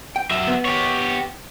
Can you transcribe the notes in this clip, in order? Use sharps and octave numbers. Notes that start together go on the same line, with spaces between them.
G5
F#3 E5
B3
G4 C#5